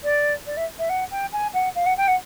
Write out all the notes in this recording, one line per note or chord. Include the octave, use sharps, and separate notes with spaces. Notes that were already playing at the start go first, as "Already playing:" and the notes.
D5
D5
E5
E5
F#5
G5
G#5
F#5
F5
F#5
G5
F#5